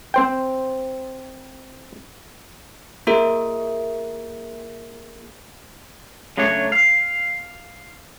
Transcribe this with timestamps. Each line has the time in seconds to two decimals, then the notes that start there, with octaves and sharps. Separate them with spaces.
0.14 C4 C5 G5
3.07 A#3 F4 G#4 A#4 E5
6.37 C#3 F#3 A3 D4 C#5
6.72 F5